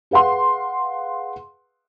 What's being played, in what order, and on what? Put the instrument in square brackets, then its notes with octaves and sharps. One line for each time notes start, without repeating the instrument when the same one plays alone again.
[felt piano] G#4 B4 F5 F#5 C6